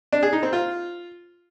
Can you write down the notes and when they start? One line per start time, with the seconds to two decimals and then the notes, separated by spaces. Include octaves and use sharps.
0.12 D4
0.23 G#4
0.33 D#4
0.43 C4
0.53 F4